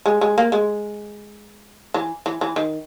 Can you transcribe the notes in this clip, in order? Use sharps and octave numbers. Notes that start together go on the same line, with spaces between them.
G#3
G#3
A#3
G#3
E3
E3
E3
D#3